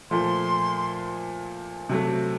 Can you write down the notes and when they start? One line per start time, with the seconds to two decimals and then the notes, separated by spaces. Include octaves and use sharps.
0.11 A#2 F3 A3 C6
1.89 C3 F#3 A3